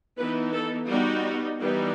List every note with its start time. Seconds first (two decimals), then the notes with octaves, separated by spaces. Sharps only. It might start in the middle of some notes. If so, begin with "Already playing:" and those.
0.17 E3 B3 D#4 B4
0.54 A4
0.88 G3 B3 D#4 F#4
1.60 E3 G3 B3 D#4